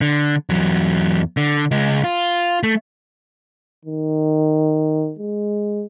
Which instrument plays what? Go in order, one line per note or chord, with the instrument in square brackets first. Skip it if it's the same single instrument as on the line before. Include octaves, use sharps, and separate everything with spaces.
[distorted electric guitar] D3
E2 F#3
D3
C#2 G#3
F4
A3
[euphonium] D#3
G#3